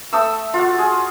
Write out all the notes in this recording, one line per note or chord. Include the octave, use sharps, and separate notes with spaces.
A3 D#6 E6
F4 F#4
G#4